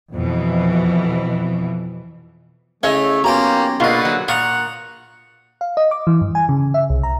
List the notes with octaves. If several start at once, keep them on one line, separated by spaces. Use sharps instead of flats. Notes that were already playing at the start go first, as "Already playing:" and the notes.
F2 B2 E3
C#3 A3 E4 C#5 D#5
B1 A#3 C#4 F4 G4 G5 A#5
A#1 B2 D3 A#3 F4 F#4 B4 D#5
F#3
A#2 F#5 A#5 C#6 D#6
F5
D#5
D6
E3
G2
G#5
C#3
E5
C2
A#5